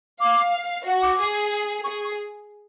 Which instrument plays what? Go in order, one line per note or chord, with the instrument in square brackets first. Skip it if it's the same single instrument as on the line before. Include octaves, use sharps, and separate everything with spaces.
[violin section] F5 [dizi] D6
[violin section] F#4
[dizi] D6
[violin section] G#4
[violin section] G#4 [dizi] C#6